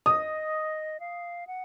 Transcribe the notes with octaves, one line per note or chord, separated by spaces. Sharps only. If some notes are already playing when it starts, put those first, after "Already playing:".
D#5 D#6
F5
F#5